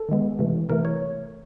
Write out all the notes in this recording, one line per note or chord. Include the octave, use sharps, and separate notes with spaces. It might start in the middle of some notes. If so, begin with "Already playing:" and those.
Already playing: A4
D#3 G#3 B3
C3 E3 A3
C3 E3 A3 A#4
C#5